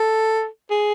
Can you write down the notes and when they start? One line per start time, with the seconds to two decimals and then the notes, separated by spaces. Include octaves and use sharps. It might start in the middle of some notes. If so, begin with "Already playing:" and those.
Already playing: A4
0.70 G#4